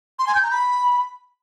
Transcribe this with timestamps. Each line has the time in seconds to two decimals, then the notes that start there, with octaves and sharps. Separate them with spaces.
0.19 C6
0.27 G#5
0.35 G6
0.43 A#5
0.51 B5